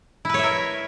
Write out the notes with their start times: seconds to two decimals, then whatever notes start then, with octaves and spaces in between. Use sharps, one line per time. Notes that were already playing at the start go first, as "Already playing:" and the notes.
0.25 E4
0.29 B4
0.34 C#5
0.39 E5
0.44 A#4